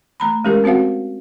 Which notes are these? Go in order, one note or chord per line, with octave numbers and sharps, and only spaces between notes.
A3 A#5 B5
G#3 C#4 G4 A#4 F5
C4 F#4 C5 F5 F#5